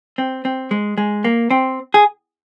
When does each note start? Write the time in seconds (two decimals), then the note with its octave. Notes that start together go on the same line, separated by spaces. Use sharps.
0.18 C4
0.45 C4
0.71 G#3
0.98 G#3
1.24 A#3
1.51 C4
1.94 G#4